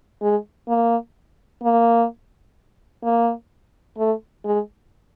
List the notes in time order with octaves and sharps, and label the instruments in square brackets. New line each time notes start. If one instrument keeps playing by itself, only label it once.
[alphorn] G#3
A#3
A#3
A#3
A3
G#3